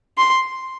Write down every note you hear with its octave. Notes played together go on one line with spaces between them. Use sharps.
C6